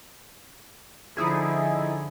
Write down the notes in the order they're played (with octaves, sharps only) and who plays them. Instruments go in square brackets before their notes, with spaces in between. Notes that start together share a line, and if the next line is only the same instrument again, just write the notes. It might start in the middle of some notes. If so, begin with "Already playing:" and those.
[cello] D3 F3 [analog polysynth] D#4 E4 G#4